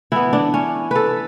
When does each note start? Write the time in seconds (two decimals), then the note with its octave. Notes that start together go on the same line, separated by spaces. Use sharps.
0.12 E3 B3 E4
0.33 D4
0.54 C#4
0.91 A4 B4